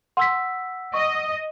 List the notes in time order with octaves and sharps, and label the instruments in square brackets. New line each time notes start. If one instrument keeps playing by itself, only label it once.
[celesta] F#5 E6 B6 [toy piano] C6
[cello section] D#5 [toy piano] C#6